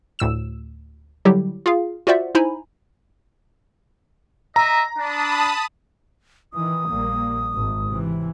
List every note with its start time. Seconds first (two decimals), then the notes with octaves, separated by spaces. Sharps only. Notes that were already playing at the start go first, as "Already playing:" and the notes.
0.19 D2 A2 E6 E7
1.25 D3 F#3 G3 E4 G4
1.66 F4 G#4 F5
2.07 F4 F#4 C5 D5 E5 F#5
2.35 D#4 E4 C5 G#5 A#5 B5
4.56 D#5 E5 A#5
4.98 D4 A5 B5 D#6
6.54 D#3 E3 D#6
6.88 A#1 G3 A#3
7.55 G#1
7.89 C3 E3